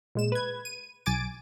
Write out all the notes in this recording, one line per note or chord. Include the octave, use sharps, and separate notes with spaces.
A#2 G#3 E7
B4 G#6
D#7
B1 G#5 D6 A6 D7